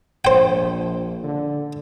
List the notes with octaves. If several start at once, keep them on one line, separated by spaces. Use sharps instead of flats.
A#1 C5 G5
D3